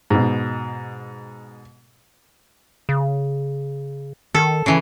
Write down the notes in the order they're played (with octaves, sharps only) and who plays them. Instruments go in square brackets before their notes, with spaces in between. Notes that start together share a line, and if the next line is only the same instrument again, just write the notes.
[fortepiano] G#2 B2
[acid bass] C#3
[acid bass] D#3 [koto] A4
[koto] C#3 E3